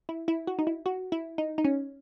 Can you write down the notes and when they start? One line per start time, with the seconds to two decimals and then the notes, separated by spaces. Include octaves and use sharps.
0.09 E4
0.28 E4
0.47 F#4
0.59 D#4
0.67 E4
0.86 F#4
1.12 E4
1.38 D#4
1.58 D#4
1.65 C#4